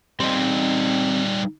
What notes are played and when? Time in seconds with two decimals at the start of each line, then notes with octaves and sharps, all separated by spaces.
0.20 G3 C4 D#4 C6